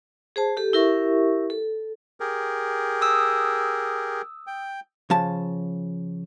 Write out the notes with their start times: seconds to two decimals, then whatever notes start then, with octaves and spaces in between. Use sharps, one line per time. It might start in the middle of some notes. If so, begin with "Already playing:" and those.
0.36 G#4 C5 A5
0.57 G4 A4
0.73 E4 G4 A#4 E5 C#6
1.50 A4
2.20 G4 G#4 A#4
3.02 D#6 E6
4.47 G5
5.10 C#3 F3 A5